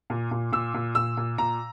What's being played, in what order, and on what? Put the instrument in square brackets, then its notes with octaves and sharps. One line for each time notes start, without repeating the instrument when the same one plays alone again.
[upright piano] A#2
A#2
A#2 E6
A#2
A#2 E6
A#2
A#2 A#5